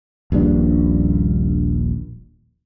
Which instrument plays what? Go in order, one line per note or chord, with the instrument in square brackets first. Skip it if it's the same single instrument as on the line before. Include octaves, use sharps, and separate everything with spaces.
[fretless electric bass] D#1 A#1 G2 D4